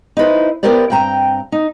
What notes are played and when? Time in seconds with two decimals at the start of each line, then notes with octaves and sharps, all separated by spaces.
0.17 D#4 E4 B4 C5
0.63 B3 E4 G4 A#4 C5 D5
0.90 G2 C4 G5 A#5
1.52 D#4